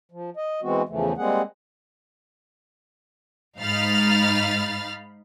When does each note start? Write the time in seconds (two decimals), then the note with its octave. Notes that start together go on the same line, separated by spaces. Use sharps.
0.12 F3
0.37 D#5
0.62 E3 G#3 B3 C4 F#4
0.89 E2 C#3 E3 F3 A3
1.18 G3 G#3 A#3 C4 G#4 F#5
3.59 G#2 D#4 F5 B5 F6 A6